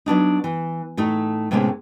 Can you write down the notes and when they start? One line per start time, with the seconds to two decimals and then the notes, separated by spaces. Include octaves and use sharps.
0.06 F#3 B3 D4 D#4
0.44 E3
0.97 A2 A3 D#4 A4
1.51 A2 C3 G#3 A#3 B3 C#4